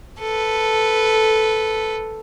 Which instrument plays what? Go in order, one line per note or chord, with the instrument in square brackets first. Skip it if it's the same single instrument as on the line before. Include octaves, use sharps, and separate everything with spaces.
[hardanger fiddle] A4 B4